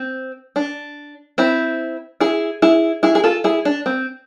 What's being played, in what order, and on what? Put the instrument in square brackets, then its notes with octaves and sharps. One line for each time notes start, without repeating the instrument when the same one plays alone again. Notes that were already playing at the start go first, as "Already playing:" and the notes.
Already playing: [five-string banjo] C4
D4
C4 E4
E4 G#4
E4 G#4
E4 G#4
G#4
F4 A4
E4 G#4
D4
C4